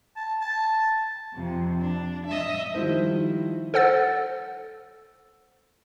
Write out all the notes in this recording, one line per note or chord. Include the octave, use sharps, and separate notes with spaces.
A5
A5
F2 C3
D4
D#5 E5
D#3 F3 G3 E4 C5
A4 C5 F#5 E6 A6